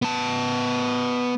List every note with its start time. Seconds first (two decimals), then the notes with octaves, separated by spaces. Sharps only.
0.02 B3 A5